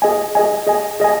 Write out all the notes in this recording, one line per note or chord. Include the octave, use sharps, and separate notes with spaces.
G#4 D#5 G#5
G#4 D#5 G#5
G#4 D#5 G#5
G#4 D#5 G#5